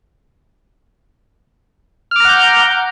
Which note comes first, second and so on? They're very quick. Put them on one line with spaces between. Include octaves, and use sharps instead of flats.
F6 D6 A#5 F#5 G6